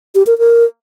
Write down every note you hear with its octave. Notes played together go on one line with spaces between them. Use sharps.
G4
A#4
A#4